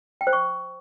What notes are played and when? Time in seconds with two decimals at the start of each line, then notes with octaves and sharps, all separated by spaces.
0.21 G5
0.27 C5
0.33 C#6